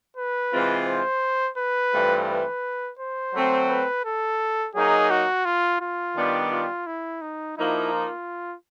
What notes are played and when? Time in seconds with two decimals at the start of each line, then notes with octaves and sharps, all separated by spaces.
0.17 B4
0.52 C3 E3 G#3 C4 F4
0.87 C5
1.57 B4
1.93 G2 E3 A3 C4 F4
2.28 B4
2.99 C5
3.34 F#3 A3 C4
3.69 B4
4.05 A4
4.75 F#3 A#3 D#4 G#4
5.10 F#4
5.45 F4
5.81 F4
6.16 D#3 G3 B3 D4 G4
6.52 F4
6.87 E4
7.22 D#4
7.57 F3 A#3 D#4 E4
7.92 F4